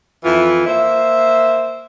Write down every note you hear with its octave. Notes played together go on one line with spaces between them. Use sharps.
F2 E3 E4 F4
A#3 C5 E5